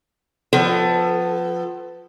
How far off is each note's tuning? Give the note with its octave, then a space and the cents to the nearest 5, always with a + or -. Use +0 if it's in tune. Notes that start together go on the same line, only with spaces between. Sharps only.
F3 +15 B3 +30 A4 +10